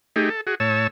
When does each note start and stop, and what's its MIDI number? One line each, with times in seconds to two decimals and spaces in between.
0.16 0.29 57
0.16 0.29 63
0.16 0.29 67
0.16 0.29 68
0.30 0.41 69
0.47 0.55 66
0.47 0.55 68
0.60 0.87 45
0.60 0.87 73
0.60 0.87 81
0.60 0.87 88